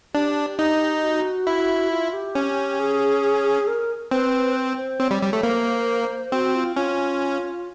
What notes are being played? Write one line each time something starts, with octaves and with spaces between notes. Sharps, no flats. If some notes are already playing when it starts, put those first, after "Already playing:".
D4 G4
D#4
F#4
E4
F4
G4
C#4
G#4
A#4
C4 B4
C5
C5
C4 C#5
G3
G3
A3
A#3 C5
C4 F#4
F4
C#4 F4